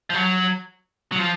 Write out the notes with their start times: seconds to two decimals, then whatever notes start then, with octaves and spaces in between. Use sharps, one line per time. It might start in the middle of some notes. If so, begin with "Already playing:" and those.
0.10 F3
0.14 F#3
1.12 F#3
1.19 F3